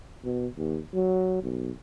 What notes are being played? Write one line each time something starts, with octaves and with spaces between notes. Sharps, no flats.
B2
D#2
F#3
B1